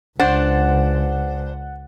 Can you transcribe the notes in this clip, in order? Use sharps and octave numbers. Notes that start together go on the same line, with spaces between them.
C#2 D4 C5 F#5 A6